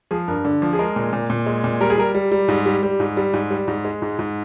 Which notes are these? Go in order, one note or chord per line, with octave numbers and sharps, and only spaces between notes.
F3 G#4
G2 A#4
D3
F3
G#4
G#3 A#4
A#2
A#2
A#2
G#3
A#2
G3 A#4
G#4
G3 A#4
G3
G3
G#2
G3
G3
G#2
G3
G#2
G3
G#2
G#3
G#2
G#2